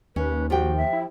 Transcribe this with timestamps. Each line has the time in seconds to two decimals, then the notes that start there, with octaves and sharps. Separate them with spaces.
0.16 D#2 C#4 B4
0.50 F3 F#4 G4 G5
0.77 E5
0.93 E4